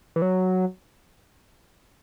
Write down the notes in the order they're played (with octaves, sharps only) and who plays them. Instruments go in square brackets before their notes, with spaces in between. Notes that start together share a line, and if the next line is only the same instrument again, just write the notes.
[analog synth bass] E3
F#3